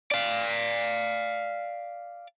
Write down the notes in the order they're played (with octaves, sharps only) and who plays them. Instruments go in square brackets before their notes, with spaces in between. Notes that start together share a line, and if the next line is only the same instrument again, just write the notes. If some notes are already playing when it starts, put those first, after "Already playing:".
[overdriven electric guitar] D5 F5